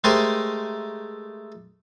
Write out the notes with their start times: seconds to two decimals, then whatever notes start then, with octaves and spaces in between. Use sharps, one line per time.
0.04 G#3 A3 G4 A#4 C5 G#5